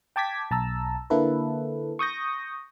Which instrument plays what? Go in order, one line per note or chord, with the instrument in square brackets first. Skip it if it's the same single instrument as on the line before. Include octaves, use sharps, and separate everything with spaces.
[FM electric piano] G5 A5 D6 G#6 B6
B1 A5 A#5 E6
D3 A#3 E4 A4 B4
C#6 D#6 G6 A#6